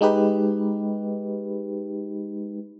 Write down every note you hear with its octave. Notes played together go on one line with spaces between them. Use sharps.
G#3 D#4 G4 B4